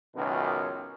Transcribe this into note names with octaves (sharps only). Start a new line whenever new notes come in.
C#2 F#2 B2 D#3